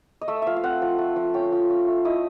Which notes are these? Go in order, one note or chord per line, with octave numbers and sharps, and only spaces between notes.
D#5
A3 E5
F3 E5 F5
F5
C4 F#5
F3
A3
F3
C#4 G5
F3
C#4
A3
E4 D#5